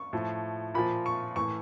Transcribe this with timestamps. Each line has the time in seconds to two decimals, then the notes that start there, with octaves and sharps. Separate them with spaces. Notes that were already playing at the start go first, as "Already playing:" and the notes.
Already playing: C#6
0.13 A2 F3
0.74 A#2 F3 B5
1.06 C#6
1.36 A2 E3 C#6